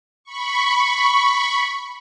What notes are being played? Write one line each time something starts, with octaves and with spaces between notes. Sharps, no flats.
B5 C#6